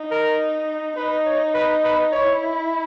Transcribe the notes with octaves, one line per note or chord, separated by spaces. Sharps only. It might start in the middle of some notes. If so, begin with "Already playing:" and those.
Already playing: D#4
A#4
D#4 B4
C#5
B4
B4
E4 C#5